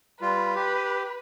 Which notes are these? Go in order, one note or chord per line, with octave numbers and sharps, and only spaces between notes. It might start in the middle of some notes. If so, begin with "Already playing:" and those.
G3 F4 B4
G4